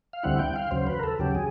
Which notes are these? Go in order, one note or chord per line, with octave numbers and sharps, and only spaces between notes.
F5
D2 D3 G3 C4 E4 F#5
G5
F5
D#2 C#3 F#3 C5
B4
A#4
A4
D#2 C#3 F#3 G4
G#4